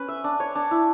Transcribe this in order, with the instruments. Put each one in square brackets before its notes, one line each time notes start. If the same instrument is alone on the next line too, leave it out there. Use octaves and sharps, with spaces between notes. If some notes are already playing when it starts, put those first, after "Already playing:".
Already playing: [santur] C#4 B4
E5
D4
C#5
D4
E4